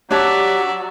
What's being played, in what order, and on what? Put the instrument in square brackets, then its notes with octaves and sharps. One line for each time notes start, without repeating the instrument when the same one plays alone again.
[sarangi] F#3 [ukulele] D4 C#5 A5 [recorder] G4 [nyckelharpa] D5 E5